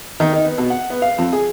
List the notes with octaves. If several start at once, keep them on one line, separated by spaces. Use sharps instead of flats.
D#3
D#4
B3
B2
F#5
B3
F5
F2
G#4